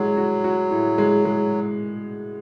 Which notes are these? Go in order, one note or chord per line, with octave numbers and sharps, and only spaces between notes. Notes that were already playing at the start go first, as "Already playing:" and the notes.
Already playing: A2 F#3 G#3 F#4
F#4
F#4
A2
G#3
G#3